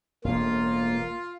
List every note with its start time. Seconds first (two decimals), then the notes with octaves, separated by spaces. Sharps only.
0.24 E1 A2 A#3 F4